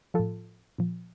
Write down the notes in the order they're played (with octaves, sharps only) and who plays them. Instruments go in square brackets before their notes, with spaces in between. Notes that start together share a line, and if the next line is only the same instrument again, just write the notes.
[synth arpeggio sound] A2 F3 F4 A4
A#2 F3